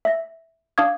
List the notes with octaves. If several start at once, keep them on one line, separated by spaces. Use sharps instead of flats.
E5 A#6
D4 F5 D6 D#6 G#6